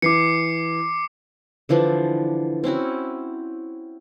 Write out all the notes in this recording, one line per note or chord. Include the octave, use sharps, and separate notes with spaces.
E3 D6 C7 C#7
D3 E3 F3 D4
C4 C#4 E4 F#4